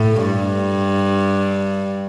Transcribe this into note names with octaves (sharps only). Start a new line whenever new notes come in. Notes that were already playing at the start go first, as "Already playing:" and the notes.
Already playing: A2
G2